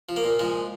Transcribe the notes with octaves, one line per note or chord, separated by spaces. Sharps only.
F3
A#3
A#2
F3 G#3